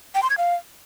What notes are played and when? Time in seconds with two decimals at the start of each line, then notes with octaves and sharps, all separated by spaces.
0.15 G5
0.23 C6
0.30 G#6
0.38 F5